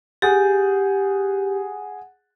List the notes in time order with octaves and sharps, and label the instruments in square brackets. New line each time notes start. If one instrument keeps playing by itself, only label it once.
[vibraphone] G4 [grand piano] G#4 F#5 A6